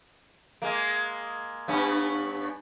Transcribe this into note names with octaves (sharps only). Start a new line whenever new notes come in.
G#3 A#3
G2 B3 C#4